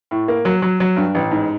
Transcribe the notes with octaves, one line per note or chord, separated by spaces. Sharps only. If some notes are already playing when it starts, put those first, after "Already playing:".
A2
A#3
F#3
F#3
F#3
G2
A1
G#2